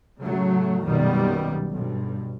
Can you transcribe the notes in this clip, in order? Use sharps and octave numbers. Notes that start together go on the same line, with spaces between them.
A2 C#3 F#3 A3
B1 F#2 A#2 D#3 G3 B3
B1 G2